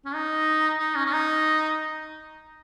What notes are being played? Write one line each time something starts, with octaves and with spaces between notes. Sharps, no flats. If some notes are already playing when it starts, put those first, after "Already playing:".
C#4
D#4
D#4
C#4
C#4
D#4